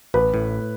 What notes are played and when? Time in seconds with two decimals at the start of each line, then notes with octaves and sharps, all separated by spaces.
0.14 A1 B4
0.34 A2